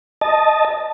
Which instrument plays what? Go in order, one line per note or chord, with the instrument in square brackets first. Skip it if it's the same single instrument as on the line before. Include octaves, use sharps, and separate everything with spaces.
[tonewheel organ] D#5 A5